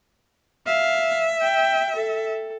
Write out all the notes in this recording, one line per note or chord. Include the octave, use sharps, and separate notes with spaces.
E5 F5
G5
A4